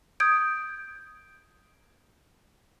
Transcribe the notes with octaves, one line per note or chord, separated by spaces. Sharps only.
D#6 G6 G#6 D7